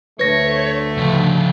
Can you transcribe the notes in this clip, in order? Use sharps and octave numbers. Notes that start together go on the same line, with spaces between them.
D2 A3 B4 C#5 A#6
C#3 F3